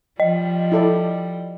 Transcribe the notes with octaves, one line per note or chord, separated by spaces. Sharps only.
F3 G3 D#5
E4 A4 D5